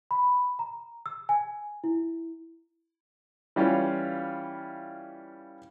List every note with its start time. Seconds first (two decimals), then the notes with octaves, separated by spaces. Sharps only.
0.11 B5
0.59 A#5
1.06 E6
1.29 G#5
1.84 E4
3.56 E3 G3 C#4 F4